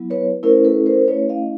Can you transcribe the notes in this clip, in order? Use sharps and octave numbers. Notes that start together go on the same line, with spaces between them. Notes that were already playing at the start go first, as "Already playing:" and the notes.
Already playing: F#3 B3 E4
B4 C#5
A3 C#4 E4 A#4 C5
A4 B4
A#4 C5
A3 C#4 E4 B4 C#5
D#5 F5